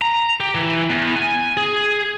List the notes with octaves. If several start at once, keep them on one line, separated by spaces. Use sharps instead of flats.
A#5
G4
E3
E2
G#5
G#4